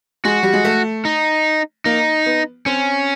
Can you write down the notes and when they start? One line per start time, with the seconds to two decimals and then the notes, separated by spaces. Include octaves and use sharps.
0.25 G#3 F#4
0.43 G3
0.54 G#3
0.65 A3
1.05 D#4
1.85 A#3 D#4
2.26 B3
2.66 C4 C#4